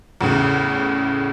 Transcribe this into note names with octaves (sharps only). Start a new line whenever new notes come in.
E2 A2 C#3